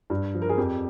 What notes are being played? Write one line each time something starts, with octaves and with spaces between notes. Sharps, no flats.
G2
F3
A#4
G#4
F2 G4